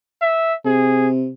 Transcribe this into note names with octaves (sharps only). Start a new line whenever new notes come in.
E5
C3 G#4